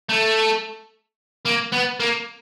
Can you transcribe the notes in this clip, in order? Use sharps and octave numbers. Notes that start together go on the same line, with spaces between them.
A3
A#3
B3
A#3